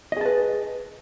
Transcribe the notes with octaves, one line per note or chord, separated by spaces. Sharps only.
G#4 B4 D#5 A5